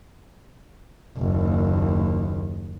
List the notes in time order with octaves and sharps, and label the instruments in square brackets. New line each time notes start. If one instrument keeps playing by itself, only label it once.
[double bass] F#1 D#2